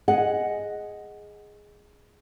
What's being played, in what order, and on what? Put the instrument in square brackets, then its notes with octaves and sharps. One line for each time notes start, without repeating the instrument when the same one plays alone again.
[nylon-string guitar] G#4 D#5 F#5